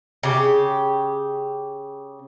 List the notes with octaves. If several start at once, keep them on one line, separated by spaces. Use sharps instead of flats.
C#3 G4